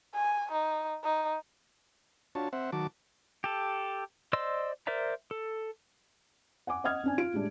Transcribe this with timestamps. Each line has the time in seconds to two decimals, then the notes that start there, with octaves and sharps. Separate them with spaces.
0.14 G#5
0.52 D#4
1.04 D#4
2.35 D4 F4 F#4 C#5 A5
2.53 C4 C5 E5 F#5
2.72 D#3 F#3 F#4 A5 D6
3.44 G4 A4
4.33 C5 D5 D#5 C6 E6
4.87 A#4 C5 D5 E5 A#5
5.31 A4
6.67 F#5 G#5 D6
6.84 D#5 F#5 D#6 F6 G#6
7.04 C4 D4 G#5
7.18 F4 D7
7.34 A2 G3 G#3 D4